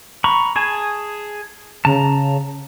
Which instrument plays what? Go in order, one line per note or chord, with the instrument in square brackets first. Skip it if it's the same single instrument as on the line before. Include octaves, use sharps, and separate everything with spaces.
[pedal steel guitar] A#5 B5 C#6
G#4 G#5 A5
[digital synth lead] C#3 [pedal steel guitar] A5 A#5